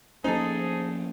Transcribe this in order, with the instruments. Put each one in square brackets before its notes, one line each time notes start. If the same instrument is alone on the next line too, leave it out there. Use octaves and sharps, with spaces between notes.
[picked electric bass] F3 A#3 C#4 [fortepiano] D#4 A4 [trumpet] G#4 [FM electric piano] C5